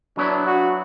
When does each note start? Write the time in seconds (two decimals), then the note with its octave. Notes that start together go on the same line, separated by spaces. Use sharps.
0.17 F#3 B3 D4 E4
0.47 F#4